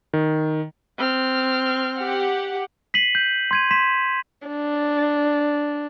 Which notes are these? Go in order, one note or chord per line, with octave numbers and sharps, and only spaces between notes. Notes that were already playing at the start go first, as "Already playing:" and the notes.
D#3
C4 F6
G4 F#5
B6 C7 D#7 F#7
G6
C6 G#6 D#7
C6 B6 E7
D4